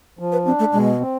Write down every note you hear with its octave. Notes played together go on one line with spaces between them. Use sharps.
F3
B4
C4 D4
A3
B2 G#3
C4